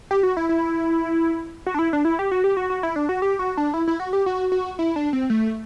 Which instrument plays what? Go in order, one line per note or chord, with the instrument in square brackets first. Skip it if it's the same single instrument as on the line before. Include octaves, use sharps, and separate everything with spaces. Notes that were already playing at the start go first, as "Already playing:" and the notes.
[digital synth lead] G4
F#4
E4
E4
F#4
D4
E4
D4
E4
G4
F#4
G4
F#4
F#4
E4
D4
F#4
G4
F#4
D4
E4
E4
F#4
G4
F#4
F#4
E4
D4
C4
A3